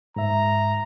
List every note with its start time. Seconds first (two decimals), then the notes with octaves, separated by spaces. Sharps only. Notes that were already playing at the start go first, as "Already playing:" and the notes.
0.16 G#2 E5 A#5